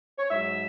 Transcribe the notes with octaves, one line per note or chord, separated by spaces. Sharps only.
C#5
G#2 F#3 E5